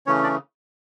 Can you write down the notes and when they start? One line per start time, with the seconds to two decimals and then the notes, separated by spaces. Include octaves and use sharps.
0.07 C#3 E3 A3 C#4 C#5
0.23 D4 D5